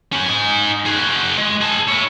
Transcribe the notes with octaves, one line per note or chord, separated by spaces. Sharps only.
C#4 F#4
D#4 G#5
F#4 G#4
G#3
G#4 A5
E4 C#5